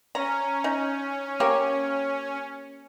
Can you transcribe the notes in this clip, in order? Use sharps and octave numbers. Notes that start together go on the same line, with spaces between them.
C#4 A#5
D#4
A#3 G4 C#5